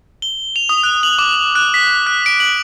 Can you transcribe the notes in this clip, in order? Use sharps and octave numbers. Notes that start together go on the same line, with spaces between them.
G7
F7
D#6
F#6
F#7
D6
F#6
B6
F#6
D7
F#7